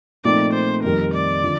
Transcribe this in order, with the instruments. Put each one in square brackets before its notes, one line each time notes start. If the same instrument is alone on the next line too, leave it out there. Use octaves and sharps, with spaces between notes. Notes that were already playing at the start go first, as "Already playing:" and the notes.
[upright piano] A#2 F3 A3 C4 D#4 [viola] D5
[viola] C5
[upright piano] F2 D#3 G3 [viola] A#4
[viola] D5
[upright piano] D3 F3